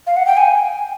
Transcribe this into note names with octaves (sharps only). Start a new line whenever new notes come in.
F5
F#5
G5
G#5